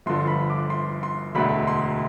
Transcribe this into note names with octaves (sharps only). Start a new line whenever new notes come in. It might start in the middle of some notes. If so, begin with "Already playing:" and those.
G1 G2 D3 F3 C6
B5
D6
C6
C6
E1 D2 D3 B5
C6